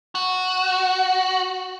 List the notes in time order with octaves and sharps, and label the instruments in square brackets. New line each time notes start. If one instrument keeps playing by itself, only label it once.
[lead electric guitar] F#4